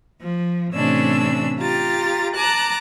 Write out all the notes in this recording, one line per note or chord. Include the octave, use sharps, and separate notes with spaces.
F3
A2 C3 E3 C#4 D4 E6
F4 G4 A#5 A6
A5 A#5 D6 F#6